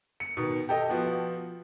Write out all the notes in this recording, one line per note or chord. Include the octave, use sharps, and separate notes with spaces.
C#7
B2 D#3
G4 A4 D#5
F3 B3 F#4